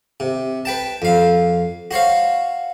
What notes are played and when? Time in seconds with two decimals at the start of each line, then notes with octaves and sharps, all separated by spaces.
0.20 C3
0.65 B4 G5 A5
1.02 F2 F5
1.91 F#4 C5 C#5 F5